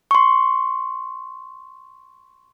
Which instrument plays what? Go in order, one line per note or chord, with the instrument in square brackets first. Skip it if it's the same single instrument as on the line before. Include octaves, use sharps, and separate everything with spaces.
[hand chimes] C6 C#6